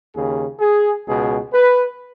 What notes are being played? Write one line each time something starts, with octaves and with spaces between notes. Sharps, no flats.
D#2 C#3 G#4
G#4
C#2 B2 G#4
B4